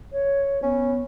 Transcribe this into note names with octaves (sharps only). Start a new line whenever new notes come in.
C#5
B3 C#4